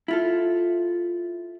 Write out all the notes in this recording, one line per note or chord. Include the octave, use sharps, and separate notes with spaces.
E4 F4 A4